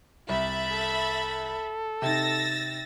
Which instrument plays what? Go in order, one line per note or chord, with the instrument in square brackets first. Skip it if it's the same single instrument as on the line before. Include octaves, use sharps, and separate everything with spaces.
[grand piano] C2 [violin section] E5 B5 A6
[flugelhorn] A4
[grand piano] C3 D#4 [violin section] E6 A6 A#6